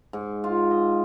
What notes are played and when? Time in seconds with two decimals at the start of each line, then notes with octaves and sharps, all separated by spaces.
0.13 G#2
0.44 F4
0.70 D#5